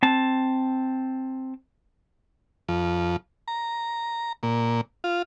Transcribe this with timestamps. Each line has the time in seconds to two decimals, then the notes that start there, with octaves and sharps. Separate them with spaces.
0.03 C4 A5
2.69 F2
3.48 A#5
4.43 A#2
5.04 F4